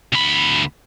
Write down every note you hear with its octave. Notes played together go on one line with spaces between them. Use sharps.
D2 B5